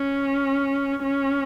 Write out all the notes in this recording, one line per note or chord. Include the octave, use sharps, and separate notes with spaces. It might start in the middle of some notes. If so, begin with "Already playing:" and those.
Already playing: C#4
C#4